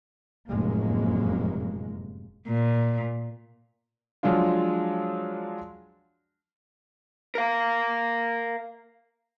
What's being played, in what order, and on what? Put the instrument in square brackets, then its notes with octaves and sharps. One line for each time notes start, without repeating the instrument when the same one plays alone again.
[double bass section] F1 F#2 A2 G#3 A#3
[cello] A#2
[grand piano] F3 F#3 G#3 D4 F4
[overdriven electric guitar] A#4 F5